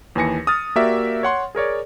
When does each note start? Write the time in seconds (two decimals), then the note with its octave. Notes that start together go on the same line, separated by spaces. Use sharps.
0.15 D#2 E3 B4 G#5 A#6 C#7
0.47 D#6 F6 A6
0.76 A#3 F#4 G4 A#4 D5 E5
1.23 C#5 F#5 C6
1.55 G#4 A#4 C#5 D5